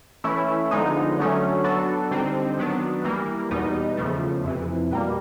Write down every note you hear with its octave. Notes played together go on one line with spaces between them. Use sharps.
E3 A3 C#4 E4
D3 F3 G#3 B3 D#4
D3 F#3 A3 C#4
F#3 B3 D4 F#4 A4
D3 G3 C4 D#4
D#3 F#3 B3 D4
E3 G3 A#3
E2 B2 G3 B3 D#4
E2 C#3 F3 A3
F2 C3 E3
B2 G3 A#3